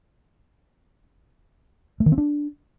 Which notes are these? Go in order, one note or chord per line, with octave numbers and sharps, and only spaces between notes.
A3
D#3
C4
D4